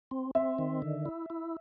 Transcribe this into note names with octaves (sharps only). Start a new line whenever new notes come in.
C4
C4 E5
D#3
D3
E4
E4